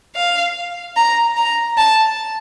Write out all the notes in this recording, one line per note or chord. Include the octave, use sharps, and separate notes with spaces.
F5
A#5
A#5
A5